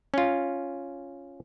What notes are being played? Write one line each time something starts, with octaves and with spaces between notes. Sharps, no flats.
C#4 F4